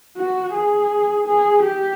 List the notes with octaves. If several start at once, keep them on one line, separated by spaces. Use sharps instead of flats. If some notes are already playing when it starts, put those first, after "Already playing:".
F#4
G#4
G#4
G4